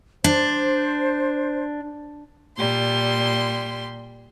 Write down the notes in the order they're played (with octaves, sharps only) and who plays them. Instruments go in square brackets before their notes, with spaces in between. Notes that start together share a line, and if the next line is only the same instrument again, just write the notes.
[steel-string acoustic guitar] D4 [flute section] C5
[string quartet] A#2 G3 C6